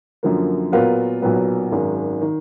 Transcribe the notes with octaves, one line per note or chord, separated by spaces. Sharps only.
F#2 D3 F3 A#3
A#2 F#3 B3 F4 A#4
B1 A#2 F#3 B3
G#1 F#2 D#3 G#3
D#3